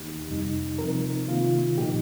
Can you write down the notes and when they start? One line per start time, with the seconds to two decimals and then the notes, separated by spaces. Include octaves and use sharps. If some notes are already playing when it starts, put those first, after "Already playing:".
Already playing: D#2 D#3 A#3 D#4 G4
0.28 F2 C3 G3 D#4
0.78 C3 F3 C4 D#4 A#4
1.28 C3 D#3 A#3 F4
1.78 A#2 F3 A#3 D#4 G4